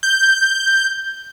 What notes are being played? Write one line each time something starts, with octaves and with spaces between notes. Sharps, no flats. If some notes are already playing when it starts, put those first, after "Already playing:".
G6